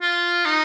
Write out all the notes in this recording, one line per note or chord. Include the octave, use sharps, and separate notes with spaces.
F4
D#4